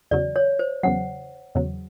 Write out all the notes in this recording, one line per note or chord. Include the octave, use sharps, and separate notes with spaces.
E2 C#3 F#3 D5
C#5
C5
E2 C#3 F#3 F#5
E2 C#3 F#3